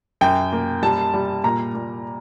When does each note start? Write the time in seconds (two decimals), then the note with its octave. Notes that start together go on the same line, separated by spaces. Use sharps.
0.21 F#2 G5
0.53 A#3
0.83 G3 A5
1.14 G3
1.44 A#2 A#5
1.75 A#2